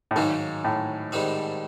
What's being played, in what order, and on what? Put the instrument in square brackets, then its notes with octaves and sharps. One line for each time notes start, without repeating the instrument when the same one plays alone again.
[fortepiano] A2
[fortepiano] G#2 [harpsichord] D#3 F#3 A#3
[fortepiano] A2
[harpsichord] G#2 D#3 G3 C4